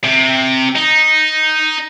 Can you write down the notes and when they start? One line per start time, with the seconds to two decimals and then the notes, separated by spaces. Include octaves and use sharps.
0.04 C3
0.76 D#4